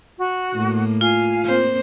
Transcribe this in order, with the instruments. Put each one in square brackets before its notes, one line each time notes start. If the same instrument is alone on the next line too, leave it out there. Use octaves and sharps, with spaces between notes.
[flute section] F#4
[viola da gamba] A2 A#3
[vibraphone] F4 [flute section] F5 G#5
[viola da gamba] A#3 C4 C5